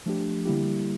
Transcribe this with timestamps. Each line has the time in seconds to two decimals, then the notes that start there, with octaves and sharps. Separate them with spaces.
0.06 F3 A3 D4 G4
0.45 D3 G3 A#3 E4 G4